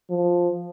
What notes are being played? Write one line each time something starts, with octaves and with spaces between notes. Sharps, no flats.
F3